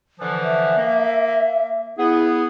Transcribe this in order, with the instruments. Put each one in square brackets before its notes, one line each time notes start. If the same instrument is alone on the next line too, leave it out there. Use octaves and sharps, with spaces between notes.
[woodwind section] D3 E3 F3
[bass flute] E5
[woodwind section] A#3
[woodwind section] B3 G#4 [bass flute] E4